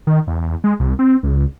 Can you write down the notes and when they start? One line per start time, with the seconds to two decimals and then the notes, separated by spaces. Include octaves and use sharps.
0.07 D#3
0.27 E2
0.64 G#3
0.80 C2
0.99 C4
1.23 C#2